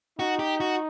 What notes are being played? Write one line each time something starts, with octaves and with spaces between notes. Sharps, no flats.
D#4 F#4
G4
F#4